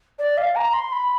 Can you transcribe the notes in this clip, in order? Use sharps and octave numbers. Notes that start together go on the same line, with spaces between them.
D5
F5
A#5
C6
B5